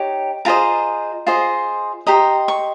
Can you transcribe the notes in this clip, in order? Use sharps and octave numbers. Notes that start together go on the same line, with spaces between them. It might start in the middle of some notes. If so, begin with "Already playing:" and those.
Already playing: D#4 G4 C#5
F4 G#4 C5 D#5 A#5
F4 G#4 C5 D#5
G4 C5 D#5 A#5
C#6